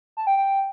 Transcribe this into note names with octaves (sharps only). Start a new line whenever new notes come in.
A5
G5
G5